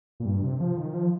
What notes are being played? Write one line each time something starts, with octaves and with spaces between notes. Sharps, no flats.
A#2
G2
C3
F3
D#3
F3